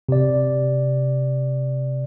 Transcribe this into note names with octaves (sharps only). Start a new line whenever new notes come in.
C3 D5